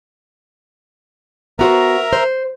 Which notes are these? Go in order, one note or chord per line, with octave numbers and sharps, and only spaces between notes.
B3 F#4 A#4 C5 E5 A#5
C5